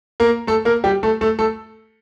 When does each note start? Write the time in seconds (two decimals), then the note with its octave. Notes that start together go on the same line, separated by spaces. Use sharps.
0.20 A#3 A#4
0.47 A3 A4
0.65 A#3 A#4
0.84 G3 G4
1.03 A3 A4
1.21 A3 A4
1.39 A3 A4